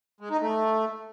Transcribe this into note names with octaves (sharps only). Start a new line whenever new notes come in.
G#3
D#4
A3